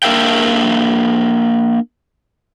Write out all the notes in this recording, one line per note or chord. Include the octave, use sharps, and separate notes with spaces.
A#3 D4 A#4 E5 F5 G5